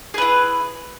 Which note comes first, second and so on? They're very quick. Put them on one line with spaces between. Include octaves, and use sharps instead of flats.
G#4 B4 E4